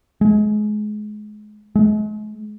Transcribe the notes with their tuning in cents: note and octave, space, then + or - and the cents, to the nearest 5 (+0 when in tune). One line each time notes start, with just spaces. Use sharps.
G#3 +30
G#3 +40